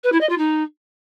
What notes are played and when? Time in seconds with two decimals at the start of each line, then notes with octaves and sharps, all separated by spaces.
0.04 B4
0.12 E4
0.21 D#5
0.29 F4
0.38 D#4